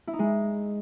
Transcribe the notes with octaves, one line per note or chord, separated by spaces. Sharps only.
E4
D#4
G#3